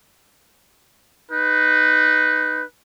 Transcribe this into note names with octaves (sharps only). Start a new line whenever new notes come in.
D#4 B4